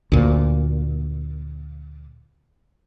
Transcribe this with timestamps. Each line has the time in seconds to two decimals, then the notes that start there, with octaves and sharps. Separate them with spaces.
0.12 D2 A#2